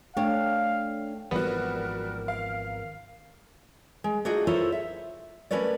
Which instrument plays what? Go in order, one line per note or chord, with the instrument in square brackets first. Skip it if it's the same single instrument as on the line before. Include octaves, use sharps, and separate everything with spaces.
[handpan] A3 [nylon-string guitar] D4 C#5 [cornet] F5 [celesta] G5
[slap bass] G#1 E3 F3 [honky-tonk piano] G3 F#4 [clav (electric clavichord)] B3 [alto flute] A#4
[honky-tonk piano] F5
[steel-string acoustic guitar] G#3
A3 D4 D#4 F4 F#4 G#4
E4 F4 A4 A#4 C5 C#5
E5
A3 C#4 A#4 B4 C#5 D5